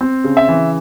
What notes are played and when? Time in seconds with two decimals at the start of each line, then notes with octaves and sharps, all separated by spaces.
0.01 C4
0.24 C#3
0.37 E5
0.48 E3